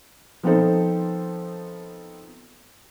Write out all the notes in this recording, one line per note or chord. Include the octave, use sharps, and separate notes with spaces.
F3 B3 C4 D#4 A4 C5